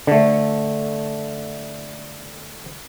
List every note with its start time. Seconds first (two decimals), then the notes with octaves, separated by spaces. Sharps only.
0.07 D3 A3